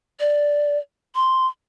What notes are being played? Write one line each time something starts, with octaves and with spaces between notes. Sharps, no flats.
D5
C6